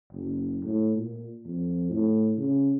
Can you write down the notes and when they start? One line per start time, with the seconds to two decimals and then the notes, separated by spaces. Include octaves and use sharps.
0.13 F#1
0.64 A2
0.96 A#2
1.45 F2
1.91 A2
2.38 C#3